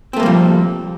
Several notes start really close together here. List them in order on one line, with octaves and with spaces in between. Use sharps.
C4 A3 A#3 G3 F3